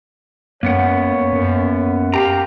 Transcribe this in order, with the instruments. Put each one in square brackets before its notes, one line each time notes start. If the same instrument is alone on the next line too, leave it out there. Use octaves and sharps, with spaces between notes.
[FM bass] F#2 [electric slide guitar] A#3 B3 F#5 [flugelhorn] C#5
[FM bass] F#2
[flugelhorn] G4 [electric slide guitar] F5 G5 A#5